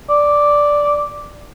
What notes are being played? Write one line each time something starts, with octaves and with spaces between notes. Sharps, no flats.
D5